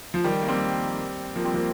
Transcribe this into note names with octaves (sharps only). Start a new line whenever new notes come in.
F3
D#3 G3
A#3
G3 C4
F3 A#3
G3 C4
F3 A#3